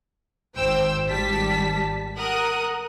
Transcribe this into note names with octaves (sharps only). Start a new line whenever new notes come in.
G#1 C5 G5 E6
G#1 G3 A5 B6
A#4 F#5 D#6 F#6